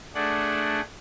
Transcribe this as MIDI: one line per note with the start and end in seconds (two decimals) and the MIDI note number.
0.15 0.81 57
0.15 0.81 62
0.15 0.81 68
0.15 0.81 74
0.15 0.81 78